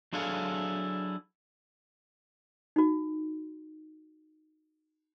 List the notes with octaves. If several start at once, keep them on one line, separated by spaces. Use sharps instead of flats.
F#3 D4 E4 G#4 A4 F5
D#4 F#4